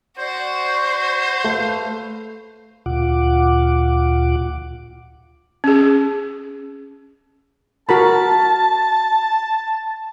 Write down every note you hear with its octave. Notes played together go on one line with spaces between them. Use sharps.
F#4 C5 D5
A3 B4 F5
D2 A#2 F4 F#5 D6
C#4 G#4
F#4 A#4 A5 B5